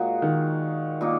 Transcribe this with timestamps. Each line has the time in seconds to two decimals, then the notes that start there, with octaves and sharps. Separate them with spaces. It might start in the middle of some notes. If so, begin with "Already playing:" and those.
Already playing: A#2 G#3 F#4
0.22 D#3
1.01 A#2 A#3 D#4